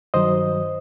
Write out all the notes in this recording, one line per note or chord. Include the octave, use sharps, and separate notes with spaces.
G2 D#3 F#3 C5 D#5